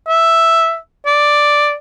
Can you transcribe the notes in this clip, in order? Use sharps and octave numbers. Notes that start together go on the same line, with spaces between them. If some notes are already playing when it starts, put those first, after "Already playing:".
E5
D5